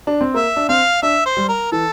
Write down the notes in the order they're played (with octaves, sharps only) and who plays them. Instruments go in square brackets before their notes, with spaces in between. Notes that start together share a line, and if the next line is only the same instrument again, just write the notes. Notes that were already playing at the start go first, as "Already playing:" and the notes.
[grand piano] D4
C4
[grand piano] A#3 [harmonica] E5
[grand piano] D4
[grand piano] C4 [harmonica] F5
[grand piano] D4 [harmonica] E5
[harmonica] C5
[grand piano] G3
[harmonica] A#4
[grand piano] E3 [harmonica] A4